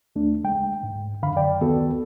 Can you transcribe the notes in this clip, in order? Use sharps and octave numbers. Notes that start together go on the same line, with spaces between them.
D#2 A3 D4
C#2 G#3 G5
G#2
C#2 F#2 D3 F5 B5
F#2 D5 G5
D2 D#3 B3 F#4 A4